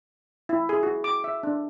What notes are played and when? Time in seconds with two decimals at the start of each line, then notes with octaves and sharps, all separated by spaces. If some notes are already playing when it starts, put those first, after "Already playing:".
0.49 E4
0.69 G#4
0.83 F#4
1.04 D6
1.24 E5
1.43 D4